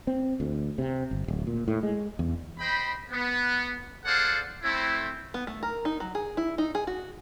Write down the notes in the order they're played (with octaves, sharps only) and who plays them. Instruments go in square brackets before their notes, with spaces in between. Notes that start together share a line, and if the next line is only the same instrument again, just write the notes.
[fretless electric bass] C4
D2
C3
G1
D1
A#2
A2
G#3
E2
[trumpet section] C5 D#5 G5 B5
B3
G#4 A4 C5 D5 F5 F#5
A3 C4 E4
[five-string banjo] B3
A3
A#4
D#4
F#3
G#4
E4
D#4
G#4
F#4